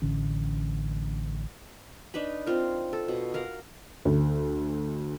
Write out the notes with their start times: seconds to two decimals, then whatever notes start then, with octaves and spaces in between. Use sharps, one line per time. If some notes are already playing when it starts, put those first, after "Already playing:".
0.02 A1 D3 C#4
2.14 D4 D#4 B4 B5
2.46 C4 F4 A#4
2.93 A4
3.08 B2
3.34 A#4 F5 F#5 A#5
4.05 D2